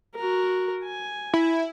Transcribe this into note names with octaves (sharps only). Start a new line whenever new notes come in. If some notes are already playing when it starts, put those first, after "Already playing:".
F#4 A#4
G#5
E4